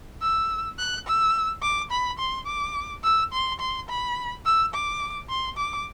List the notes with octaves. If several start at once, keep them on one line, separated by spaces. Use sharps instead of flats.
E6
F#6
E6
D6
B5
C6
D6
E6
C6
C6
B5
E6
D6
C6
D6